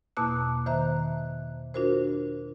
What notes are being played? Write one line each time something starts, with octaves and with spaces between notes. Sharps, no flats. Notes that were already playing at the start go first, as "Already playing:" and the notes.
E2 B2 A#3 A5 D6 F#6
D#3 C5 E5 A#5 F#6
D4 F4 F#4 A#4 C5